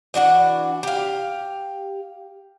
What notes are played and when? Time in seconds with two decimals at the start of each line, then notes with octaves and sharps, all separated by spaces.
0.14 E3 D4 F#4 F#5
0.83 G4 F5